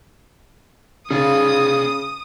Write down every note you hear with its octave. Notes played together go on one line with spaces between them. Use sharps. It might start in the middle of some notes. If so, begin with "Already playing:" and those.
C#3 G#4 D5 F5 D#6